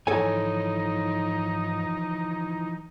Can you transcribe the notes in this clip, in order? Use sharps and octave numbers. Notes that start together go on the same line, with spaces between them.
G#2 E3 F3 D#4 A4 C#5 G#5